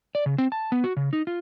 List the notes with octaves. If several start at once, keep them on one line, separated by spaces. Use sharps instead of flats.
D5
C#3
C4
A5
B3
F#4
C#3
D#4
F4